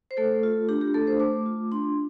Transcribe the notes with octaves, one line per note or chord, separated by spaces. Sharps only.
C5
A3 A4
F4
D4 G4
G4
A3 A4
C5
A3 D6
F4
D4 C6